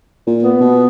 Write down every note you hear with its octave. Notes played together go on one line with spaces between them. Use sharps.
A#2
B3
B2